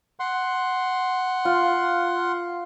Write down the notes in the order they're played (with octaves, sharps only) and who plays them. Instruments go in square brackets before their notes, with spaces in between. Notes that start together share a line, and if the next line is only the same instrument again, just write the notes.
[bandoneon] F#5 C6
[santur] F4